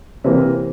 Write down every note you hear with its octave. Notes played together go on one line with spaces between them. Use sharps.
C3 E3 A#3